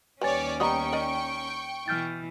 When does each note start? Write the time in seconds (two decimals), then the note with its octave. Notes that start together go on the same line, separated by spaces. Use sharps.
0.21 D#2 G3 C#4 B4 C#5 D5 G#5 A6
0.60 G3 B3 D#4 G5 A#5 C#6 D#6
0.93 A#4 D5 D#5
1.88 B2 E3 F6 G6 A6